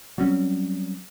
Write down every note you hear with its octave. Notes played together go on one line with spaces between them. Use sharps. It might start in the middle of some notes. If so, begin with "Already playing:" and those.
F#3 G3 C4 C#4